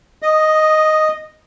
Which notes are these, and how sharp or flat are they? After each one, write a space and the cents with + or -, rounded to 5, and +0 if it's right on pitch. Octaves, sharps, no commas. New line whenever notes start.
D#5 +0 D#6 -20